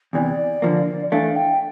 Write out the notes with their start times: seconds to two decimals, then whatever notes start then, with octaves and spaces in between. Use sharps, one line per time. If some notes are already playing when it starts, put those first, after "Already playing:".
0.13 E2 C3 E3 D5
0.62 D3 F3 A#3
1.11 E3 A3 D4 F5
1.35 G5